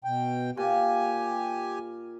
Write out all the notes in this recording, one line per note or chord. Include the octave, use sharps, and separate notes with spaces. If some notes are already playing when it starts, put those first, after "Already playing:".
B2 G5
A#2 G4 G#5